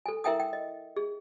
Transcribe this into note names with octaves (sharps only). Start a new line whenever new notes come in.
A4 G#5
E4 A#4 E5 G5 G#5 D#6
G5
D#5
G#4